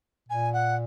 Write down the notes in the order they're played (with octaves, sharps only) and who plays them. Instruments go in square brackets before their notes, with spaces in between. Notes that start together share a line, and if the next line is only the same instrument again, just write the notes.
[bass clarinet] A#2 [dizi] G#5
[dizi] F#5